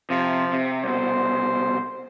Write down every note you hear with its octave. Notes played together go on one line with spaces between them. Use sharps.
C3 F3
C3
C2 B2 C5